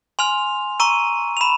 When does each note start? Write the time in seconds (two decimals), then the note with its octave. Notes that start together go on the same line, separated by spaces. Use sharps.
0.19 G#5 C6 F6 F7
0.80 A#5 C#6 E6 D#7
1.37 F7
1.41 B5 E7